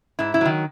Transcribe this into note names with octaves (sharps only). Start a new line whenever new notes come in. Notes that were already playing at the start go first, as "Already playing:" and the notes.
G#2 E4
E4
D#3 F#3